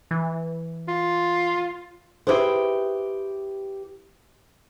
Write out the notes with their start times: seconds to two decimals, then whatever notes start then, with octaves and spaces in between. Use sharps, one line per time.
0.11 E3
0.88 F4
2.27 E4 G4 G#4 B4 C5